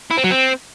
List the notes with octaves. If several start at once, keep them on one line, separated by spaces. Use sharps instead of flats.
E4
C4
F#3
C4